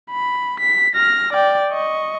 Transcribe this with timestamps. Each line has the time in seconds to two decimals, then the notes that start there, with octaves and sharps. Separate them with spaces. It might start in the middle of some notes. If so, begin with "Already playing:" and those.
0.11 B5
0.60 B6
0.95 F6 A#6
1.33 D5 G5
1.72 D#5 C#6